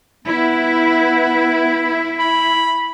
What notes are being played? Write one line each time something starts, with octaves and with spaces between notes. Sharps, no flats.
B3 E4
B5